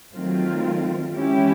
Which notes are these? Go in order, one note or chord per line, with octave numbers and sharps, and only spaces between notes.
D#3 F#3 A3 C4 F4
E3 G#3 C#4 E4 G4